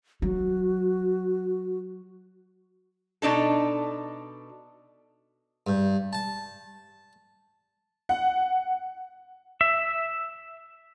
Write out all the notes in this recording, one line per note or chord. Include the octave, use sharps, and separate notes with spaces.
F#3 F#4
B2 D4 D#4 A4
G2
A5
F#5
E5